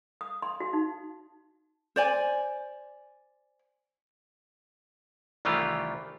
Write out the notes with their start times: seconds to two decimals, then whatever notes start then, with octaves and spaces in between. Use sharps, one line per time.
0.21 D#6
0.42 C6
0.60 F#4
0.73 D#4
1.96 C5 D5 G#5
5.45 C2 D#3 E3 A3 F4 G4